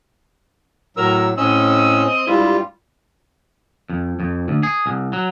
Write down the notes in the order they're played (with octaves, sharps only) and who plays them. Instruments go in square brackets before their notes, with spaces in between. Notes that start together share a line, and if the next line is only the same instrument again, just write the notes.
[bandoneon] A2 F#3 E6 [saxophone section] A#4
[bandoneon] A2 C#4 E6 [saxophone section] C4 D#5
[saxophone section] G2 G#3 E4 [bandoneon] G3 F4
[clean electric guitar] F2
F2
D2
G#4
C2
F#3